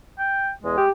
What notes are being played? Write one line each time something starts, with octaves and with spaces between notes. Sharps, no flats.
G5
E2 G#3
G4